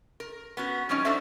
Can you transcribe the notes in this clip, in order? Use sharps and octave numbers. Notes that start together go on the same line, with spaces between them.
A#4
B3 C#4 F#4
F3 G3 C4 C#4 D#4
D4 D#4 F#4 A4 C5 E5